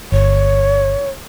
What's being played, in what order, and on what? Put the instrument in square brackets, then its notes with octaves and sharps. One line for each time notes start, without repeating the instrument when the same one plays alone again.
[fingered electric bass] G1 [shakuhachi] C#5